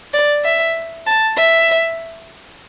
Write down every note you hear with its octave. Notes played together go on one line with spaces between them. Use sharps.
D5
E5
A5
E5